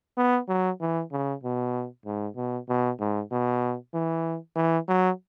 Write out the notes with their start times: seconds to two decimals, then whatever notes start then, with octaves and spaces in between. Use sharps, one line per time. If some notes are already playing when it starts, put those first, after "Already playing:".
0.18 B3
0.48 F#3
0.81 E3
1.12 C#3
1.43 B2
2.06 G#2
2.36 B2
2.69 B2
3.00 G#2
3.32 B2
3.94 E3
4.56 E3
4.88 F#3